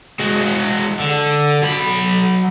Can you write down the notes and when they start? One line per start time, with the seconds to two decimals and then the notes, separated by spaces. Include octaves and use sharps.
0.19 G#3 F#4
1.00 D3
1.62 F#3 B5